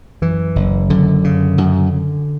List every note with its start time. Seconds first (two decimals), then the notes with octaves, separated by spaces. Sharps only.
0.22 F#2 E3
0.56 F#1
0.90 F#2 D3
1.24 C#3
1.58 F#2